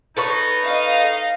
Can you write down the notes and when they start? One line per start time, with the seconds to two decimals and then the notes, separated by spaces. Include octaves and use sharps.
0.17 D#4 A4 B4 C#5
0.65 D#5 F5